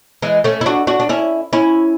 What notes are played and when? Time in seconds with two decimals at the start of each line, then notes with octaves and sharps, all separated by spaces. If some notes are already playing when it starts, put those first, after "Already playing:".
0.22 E3 G#3
0.44 A3 C#4
0.61 E4
0.66 D4 F#4
0.87 D4 F#4
1.00 D4
1.09 C#4 E4
1.53 C#4 E4